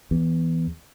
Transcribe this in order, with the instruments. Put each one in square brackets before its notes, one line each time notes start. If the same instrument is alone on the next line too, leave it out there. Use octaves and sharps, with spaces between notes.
[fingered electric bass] E2